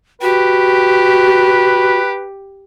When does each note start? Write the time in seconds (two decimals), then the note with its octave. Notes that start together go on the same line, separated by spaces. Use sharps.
0.22 F#4 G4 B4